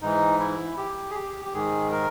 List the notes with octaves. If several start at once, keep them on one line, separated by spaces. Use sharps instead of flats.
G#2 E3 D#4
E4
G4
G#4
G4
G4
G#2 D#3 G#4
A#4